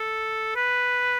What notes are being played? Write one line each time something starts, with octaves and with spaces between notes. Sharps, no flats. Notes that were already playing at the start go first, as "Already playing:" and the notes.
Already playing: A4
B4